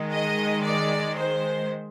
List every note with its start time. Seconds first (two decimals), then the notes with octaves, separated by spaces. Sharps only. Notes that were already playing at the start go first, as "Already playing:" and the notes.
Already playing: D#3 G#3
0.11 D#5
0.64 D5
1.17 C5